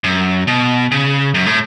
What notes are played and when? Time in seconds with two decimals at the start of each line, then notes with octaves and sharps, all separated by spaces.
0.04 F#2
0.47 B2
0.92 C#3
1.34 F#2
1.46 A2